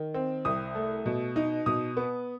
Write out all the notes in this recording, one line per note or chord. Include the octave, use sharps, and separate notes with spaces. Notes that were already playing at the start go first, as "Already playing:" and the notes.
Already playing: D#3
C4
C2 D#6
A3
B2
D#4
B2 D#6
B3